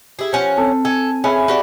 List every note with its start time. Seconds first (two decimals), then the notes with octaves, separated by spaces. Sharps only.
0.19 E4 G4 G#4
0.33 F3 C#4 F#5
0.57 C4 A4
0.85 A4 G#5
1.24 C#4 G#4 B4 E5
1.48 F#4 G4 D5